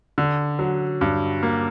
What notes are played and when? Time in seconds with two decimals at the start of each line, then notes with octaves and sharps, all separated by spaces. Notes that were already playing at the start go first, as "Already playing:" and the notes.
0.18 D3
0.59 F#3
1.01 G2
1.43 A#3